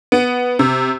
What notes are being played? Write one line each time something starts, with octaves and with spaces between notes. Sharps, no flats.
B3
C3